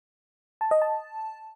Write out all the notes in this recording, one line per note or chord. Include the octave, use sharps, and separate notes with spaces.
A5
D#5
A5